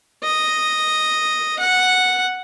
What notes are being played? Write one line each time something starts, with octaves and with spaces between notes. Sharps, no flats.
D#5
F#5